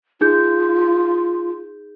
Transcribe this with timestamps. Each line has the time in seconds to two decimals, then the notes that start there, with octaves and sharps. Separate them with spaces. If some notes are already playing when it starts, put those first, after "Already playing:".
0.21 D#4 F4 G#4 G6